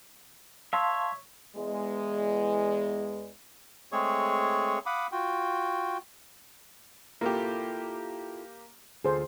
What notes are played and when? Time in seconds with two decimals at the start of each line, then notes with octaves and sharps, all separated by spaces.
0.73 C#5 E5 F5 A5 C6
1.56 E2 G#3
3.92 G#3 A3 C4 G#4 C#5 C#6
4.86 F5 F#5 B5 D6 D#6
5.12 F4 F#4 G5
7.21 A#3 E4 F4 G4 A4
9.05 D2 F4 G#4 A4 C5